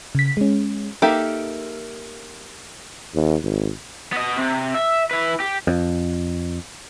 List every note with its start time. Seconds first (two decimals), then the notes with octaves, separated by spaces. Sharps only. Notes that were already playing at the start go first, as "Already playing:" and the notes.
0.15 C#3 B6
0.37 G#3 C#4
1.02 A#3 D#4 G4 A4 E5
3.15 D#2
3.43 G#1
4.12 B3 D#5
4.37 C3
4.74 E5
5.11 E4 B4
5.40 G4
5.67 F2